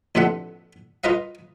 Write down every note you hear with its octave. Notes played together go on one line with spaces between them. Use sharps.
A1 F2 D3 E5 F#5
F4 A#4 B4 D#5 F5